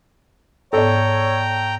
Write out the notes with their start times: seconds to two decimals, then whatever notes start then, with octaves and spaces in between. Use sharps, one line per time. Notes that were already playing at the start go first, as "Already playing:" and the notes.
0.73 G#2 B3 A4 C#5 D5 G5 A#5